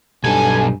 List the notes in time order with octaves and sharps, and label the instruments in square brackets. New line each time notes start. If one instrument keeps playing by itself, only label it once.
[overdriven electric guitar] B1 A4 [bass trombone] G2 [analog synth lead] G#5